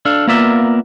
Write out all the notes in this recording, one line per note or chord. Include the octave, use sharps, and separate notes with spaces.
D4 A4 F5
A#3 B3 F4 A#4 D5 E5